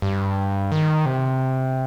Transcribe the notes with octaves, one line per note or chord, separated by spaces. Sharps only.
G2
D#3
C3